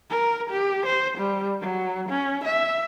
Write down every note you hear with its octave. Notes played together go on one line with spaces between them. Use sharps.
A#4
G4
C5
G3
F#3
C#4
E5